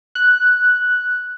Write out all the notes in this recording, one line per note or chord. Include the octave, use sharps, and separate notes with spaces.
F#6